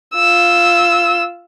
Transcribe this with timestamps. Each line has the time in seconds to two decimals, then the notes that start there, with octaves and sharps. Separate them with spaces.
0.15 F4 E6